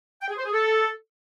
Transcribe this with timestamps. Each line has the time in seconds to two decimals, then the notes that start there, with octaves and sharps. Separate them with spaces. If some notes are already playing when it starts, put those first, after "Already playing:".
0.22 G5
0.30 G#4
0.37 C5
0.45 G#4
0.53 A4